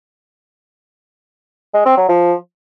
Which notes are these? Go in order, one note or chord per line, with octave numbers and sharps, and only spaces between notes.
G#3
C4
F#3
F3